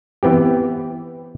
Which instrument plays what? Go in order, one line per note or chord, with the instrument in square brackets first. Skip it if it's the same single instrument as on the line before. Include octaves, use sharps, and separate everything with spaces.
[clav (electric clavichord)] E3 B3 C4 G4